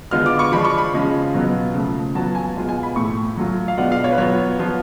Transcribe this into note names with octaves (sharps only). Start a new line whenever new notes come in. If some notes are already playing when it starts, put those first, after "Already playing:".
D3 G#3 B3 F4 F6
D6
C#6
F3 G#3 D4 F4 B5
C#6
B5
C#3 F3 G#3 C#4 F4
B2 F#3 B3 F4
C#3 F3 A3
F#3 B3 F4 A5
G#5
B2 G#3 B3 F4
G#5
B5
A2 F3 A3 C#6
F#3 A3 F4
F5
B2 G#3 B3 D4 F4 F#5
F5
C#5
B4
F#3 B3 F4 C#5
F3 B3 F4